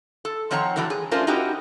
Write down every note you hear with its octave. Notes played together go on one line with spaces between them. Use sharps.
A4
D#3 F3 C4 C#5 F#5 A#5
A2 D3 E3 F#3 A3
G#4
A3 C#4 D4 F4 A#4 C5
C#4 D#4 E4 F#4 G4 D#5